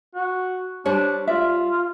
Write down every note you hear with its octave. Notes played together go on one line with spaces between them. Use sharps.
F#4
G3 D4 C5 C#5
F4 D5 E5